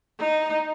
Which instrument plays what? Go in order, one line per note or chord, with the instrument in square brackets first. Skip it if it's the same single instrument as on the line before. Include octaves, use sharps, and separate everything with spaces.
[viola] D#4